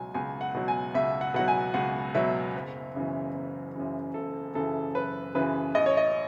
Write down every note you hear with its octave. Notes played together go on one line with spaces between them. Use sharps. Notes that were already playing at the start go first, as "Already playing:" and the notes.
Already playing: C#2 B2 F#3 G#5
C#2 G#5
F#5
B2 F#3
G#5
C#2 E5
F#5
B2 F#3 F#5
G#5
C#2 F#5
B2 F#3 E5
F#1
F#2 C#3 E3
F#1
F#2 C#3 E3
F#1 A4
F#2 C#3 E3 A4
F#1 B4
F#2 C#3 E3 B4
A1 D#5
C#5
D#5